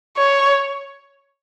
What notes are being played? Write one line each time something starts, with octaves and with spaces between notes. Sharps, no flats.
C#5